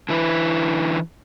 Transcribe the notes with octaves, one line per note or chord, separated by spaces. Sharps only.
D3 E3 E4 B4